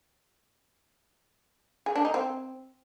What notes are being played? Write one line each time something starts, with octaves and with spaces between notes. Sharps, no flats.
G#4
D4
D#4
C4